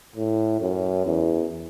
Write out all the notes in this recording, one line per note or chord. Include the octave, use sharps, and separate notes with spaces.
A2
F#2
E2